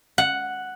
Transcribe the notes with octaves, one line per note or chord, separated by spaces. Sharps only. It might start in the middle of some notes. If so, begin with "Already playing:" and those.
F#5